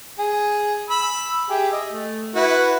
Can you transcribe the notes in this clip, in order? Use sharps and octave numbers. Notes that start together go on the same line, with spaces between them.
G#4
B5 E6
G4 G#4 E5
D#5
A3
E4 F#4 B4